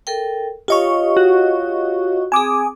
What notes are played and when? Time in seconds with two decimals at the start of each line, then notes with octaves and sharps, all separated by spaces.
0.07 A4 A#4 G5
0.68 F4 G4 C#5 D#5 F5 C#6
1.17 F#4
2.32 C4 G#4 G#5 D6 D#6